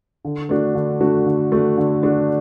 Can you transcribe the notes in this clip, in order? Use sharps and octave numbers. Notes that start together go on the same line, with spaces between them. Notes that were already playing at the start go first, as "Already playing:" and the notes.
D3
A3 D4 F#4
D3
A3 D4 F#4
D3
A3 D4 F#4
D3
A3 D4 F#4